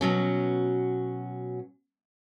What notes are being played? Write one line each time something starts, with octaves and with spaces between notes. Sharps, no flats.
B2 F#3 C#4